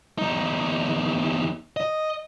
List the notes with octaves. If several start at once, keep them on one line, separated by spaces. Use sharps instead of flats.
E2 D#4
D#5